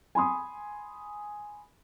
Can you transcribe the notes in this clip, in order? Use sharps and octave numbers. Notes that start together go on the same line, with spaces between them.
G#5 B5 C6 D#6